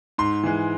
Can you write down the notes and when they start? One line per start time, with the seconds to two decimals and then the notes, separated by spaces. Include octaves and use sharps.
0.18 G#2 C6
0.43 E3 G#3